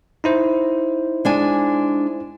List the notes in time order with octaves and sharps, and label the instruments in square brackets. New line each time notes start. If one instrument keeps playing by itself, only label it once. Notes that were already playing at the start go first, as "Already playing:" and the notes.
[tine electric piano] D#4 E4 C5
[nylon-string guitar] G#3 D4 G#5